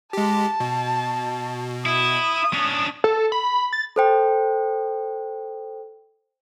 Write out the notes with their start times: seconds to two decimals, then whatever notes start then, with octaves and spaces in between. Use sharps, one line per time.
0.13 G#3 G4 A5
0.60 B2
1.86 E4 D#6
2.54 C#4 D4
3.04 A4
3.32 B5
3.73 A6
3.96 A4 C5 G5